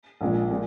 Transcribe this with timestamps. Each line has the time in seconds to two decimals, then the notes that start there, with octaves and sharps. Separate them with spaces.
0.21 A#1 A#2 F3 G#3
0.51 A#2 G#3